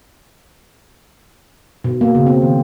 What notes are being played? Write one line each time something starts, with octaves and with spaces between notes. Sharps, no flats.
B2
A#3
C#3
C4
D#3